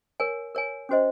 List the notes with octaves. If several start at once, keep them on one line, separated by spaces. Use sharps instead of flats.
A#4 C#5 G#5
A#4 C#5 G#5
C#4 F#4 C5 D#5